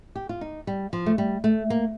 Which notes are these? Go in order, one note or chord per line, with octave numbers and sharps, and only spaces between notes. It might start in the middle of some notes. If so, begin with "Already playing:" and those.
G4
F4
D#4
G3
F3
A3
G3
A3
A#3